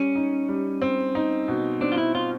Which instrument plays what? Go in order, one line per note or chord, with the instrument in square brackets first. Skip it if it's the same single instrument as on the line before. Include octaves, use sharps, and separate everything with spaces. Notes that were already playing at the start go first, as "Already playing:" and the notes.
Already playing: [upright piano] G3 [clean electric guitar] C#4
[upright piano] D#4
G3
C4
D#4
B2
[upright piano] C4 [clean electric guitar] D4
[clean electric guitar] F4
E4
[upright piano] C4 [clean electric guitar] F4